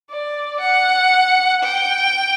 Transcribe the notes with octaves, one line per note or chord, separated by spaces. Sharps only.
D5
F#5
G5